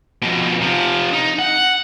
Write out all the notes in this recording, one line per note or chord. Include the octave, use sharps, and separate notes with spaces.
F2 B2
C3 F3
D#4
F#5